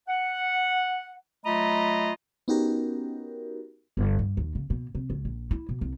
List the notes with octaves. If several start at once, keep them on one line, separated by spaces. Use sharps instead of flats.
F#5
F#3 A3 F4 D#5 A#5 B5
B3 C#4 D#4 F#4 G4 A#4
G1
G2
D#2
C#3
B2
C3
C#2
A#1
E4
B2
C2